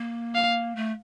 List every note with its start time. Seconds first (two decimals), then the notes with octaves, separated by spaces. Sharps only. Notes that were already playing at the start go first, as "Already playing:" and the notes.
Already playing: A#3
0.35 F5
0.76 A3